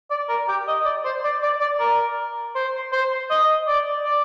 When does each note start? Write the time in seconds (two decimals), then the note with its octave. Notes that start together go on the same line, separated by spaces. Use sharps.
0.10 D5
0.29 A#4
0.49 G4
0.68 D#5
0.85 D5
1.05 C5
1.24 D5
1.43 D5
1.60 D5
1.80 A#4
2.55 C5
2.93 C5
3.30 D#5
3.68 D5
4.05 D5